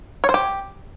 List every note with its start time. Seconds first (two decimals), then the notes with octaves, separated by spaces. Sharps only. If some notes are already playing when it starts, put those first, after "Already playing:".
0.24 C#5
0.29 C5
0.34 G4